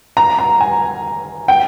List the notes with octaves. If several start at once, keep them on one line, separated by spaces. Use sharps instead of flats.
A#5
A#5
G#5
G5